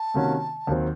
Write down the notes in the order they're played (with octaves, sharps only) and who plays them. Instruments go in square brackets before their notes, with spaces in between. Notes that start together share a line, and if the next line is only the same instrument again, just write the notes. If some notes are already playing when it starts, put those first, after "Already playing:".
Already playing: [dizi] A5
[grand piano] C3 D#3 A#3 C#4 F#4
D#2 D#3 F#3 C4